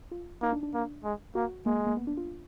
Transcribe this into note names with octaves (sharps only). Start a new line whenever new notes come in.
F4
A#3 D#4
D4
D4
A#3
G#3
A#3 F#4
G#3 A#3
A#3
B3
D4
F4